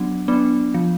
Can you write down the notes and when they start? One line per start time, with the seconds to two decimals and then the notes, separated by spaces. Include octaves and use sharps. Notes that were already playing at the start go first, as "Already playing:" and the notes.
Already playing: F#3 B3 D4
0.28 B3 D4
0.74 F3